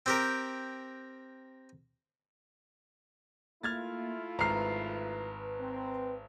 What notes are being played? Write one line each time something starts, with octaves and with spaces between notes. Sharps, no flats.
C4 G4 A#4
A3 A#3 E4 F4 F6 G#6 A6
G#1 B4 A#5 F6 C7
C4